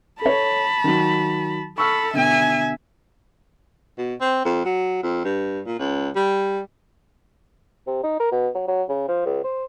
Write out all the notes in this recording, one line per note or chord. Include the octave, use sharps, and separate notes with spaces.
A4 C#5 A5 B5
D#3 F#3
A4 B5 C#6 E6 F6
B2 D3 E5 G#5
B2
C4
F2
F#3
F2
G2
A#2
C#2
G3
C3
D#4
A#4
B2
F#3
F#3
C#3
F3
C#2
C5